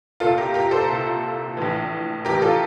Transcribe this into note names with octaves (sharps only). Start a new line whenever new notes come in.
C2 A#2 F4 A4
G4 A#4
G4 A#4
A4 C5
C2 A#2
A#1 A2 E3
A#1 A2 E3 G4 A#4
F4 A4